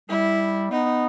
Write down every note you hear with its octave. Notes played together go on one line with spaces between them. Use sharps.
G3 E4
B3 D#4